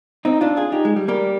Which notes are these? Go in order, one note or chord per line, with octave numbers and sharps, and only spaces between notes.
C4 D#4
D4 F4
F4 G#4
D#4 G4
G#3
G3
G3 A#3